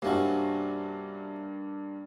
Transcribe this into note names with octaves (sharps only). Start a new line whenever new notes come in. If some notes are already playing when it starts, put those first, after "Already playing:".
G2 C3 A#3 C#4 F#4